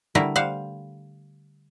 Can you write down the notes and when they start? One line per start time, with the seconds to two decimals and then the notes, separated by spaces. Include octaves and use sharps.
0.15 D3 G3 A3 E4 A#4
0.36 G3 C5 F5 F#5